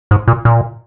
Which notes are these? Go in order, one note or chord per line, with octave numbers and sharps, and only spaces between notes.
G#2
A#2
A#2